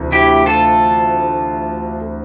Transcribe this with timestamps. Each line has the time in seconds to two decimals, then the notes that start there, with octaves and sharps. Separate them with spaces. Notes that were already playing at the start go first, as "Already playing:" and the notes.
Already playing: D2 C3 E3
0.12 E4 G4
0.46 F4 A4